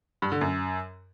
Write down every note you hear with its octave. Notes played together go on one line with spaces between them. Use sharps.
G2
D3
F#2